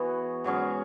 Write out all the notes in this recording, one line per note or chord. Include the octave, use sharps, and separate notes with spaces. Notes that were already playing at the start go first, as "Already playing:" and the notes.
Already playing: E3 B3 F#4 G#4 C#5
G#2 F#3 C#4 G#4